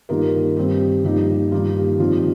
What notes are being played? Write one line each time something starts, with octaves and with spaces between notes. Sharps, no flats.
G2 D#3 G3 A#3 D#4 F4 A#4
G2 D#3 C4 G4
G4
G2 F3 A#3 D#4 G4
G2 D#3 A#3 D#4 F4
G4
F2 D#3 G3 F4